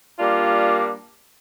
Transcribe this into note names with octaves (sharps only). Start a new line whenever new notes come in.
G3 A#3 D4 F4